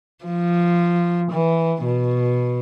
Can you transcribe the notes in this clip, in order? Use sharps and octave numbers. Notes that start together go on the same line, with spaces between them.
F3
E3
B2